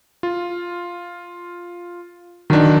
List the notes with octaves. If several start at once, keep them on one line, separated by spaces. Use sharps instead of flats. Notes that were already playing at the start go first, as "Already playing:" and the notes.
F4
D#3 F#3 D4